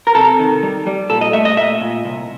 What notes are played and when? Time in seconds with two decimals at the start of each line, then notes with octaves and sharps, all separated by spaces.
0.07 A#4
0.15 C3 A4
0.39 D#3
0.63 G3
0.87 G3
1.10 A#2 A4
1.21 D#5
1.33 A3 E5
1.45 D#5
1.57 A#2 E5
1.81 A#2
2.05 C2